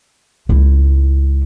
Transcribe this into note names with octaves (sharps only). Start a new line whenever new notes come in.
C#2 E4